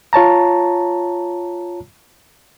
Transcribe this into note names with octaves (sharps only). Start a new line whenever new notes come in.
F4 C#5 A5 A#5